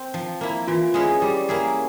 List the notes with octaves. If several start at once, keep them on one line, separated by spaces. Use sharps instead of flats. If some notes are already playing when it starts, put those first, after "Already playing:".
Already playing: C4
F3
A#3 E4
E3 F4
G#3 C#4 E4 G#4
G3 G4
A#3 C#4 E4 G#4